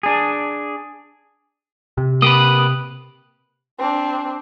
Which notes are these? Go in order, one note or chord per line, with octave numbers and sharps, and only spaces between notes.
D4 G#4
C3
A#3 G4 B4 D#6
C4 D4